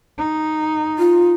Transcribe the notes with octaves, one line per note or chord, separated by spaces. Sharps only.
D#4
F4